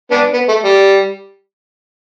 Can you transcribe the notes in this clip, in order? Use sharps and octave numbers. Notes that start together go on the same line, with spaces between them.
B3 D4
B3
A3
G3